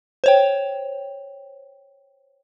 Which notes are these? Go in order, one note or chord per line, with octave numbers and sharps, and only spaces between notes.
C5 C#5 G5